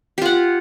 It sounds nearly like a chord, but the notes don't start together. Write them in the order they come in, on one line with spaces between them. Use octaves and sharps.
G4 F4 F#5